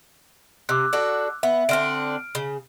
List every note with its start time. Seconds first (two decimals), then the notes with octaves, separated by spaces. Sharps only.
0.69 C3 D6 E6 F#6
0.93 D4 F#4 A4
1.43 B3 E5
1.69 D3 C4 D4 F6 D7
2.35 C#3